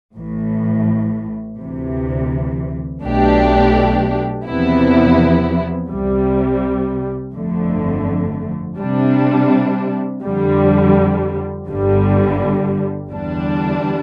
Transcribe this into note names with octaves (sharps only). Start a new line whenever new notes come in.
A1 A2 E3
D2 C3 E3
B1 B2 A3 D4 G4
E2 C3 F3 B3 E4
C2 C3 G3
G1 F2 D3 A3
C3 G3 D4
F2 D3 G3
G1 G2 D3 G3
E2 D3 G3 D4